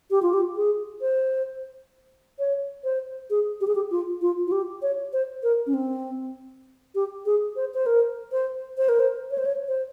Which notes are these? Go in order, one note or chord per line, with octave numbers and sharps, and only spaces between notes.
G4
F4
G4
G#4
C5
C#5
C5
G#4
G4
G#4
G4
F4
F4
F4
G4
C#5
C5
A#4
C#4
C4
G4
G#4
C5
C5
A#4
C5
C5
A#4
C5
C#5
C5
C#5
C5